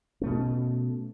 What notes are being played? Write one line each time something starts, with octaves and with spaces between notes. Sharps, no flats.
B2 A3 C#4